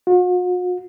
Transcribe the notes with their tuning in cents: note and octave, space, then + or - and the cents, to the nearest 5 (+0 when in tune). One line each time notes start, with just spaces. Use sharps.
F#4 -45